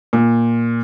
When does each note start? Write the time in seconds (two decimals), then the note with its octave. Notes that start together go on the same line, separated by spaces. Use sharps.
0.13 A#2